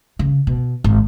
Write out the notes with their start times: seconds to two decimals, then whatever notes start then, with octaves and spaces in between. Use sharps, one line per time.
0.19 C#3
0.47 B2
0.84 G#1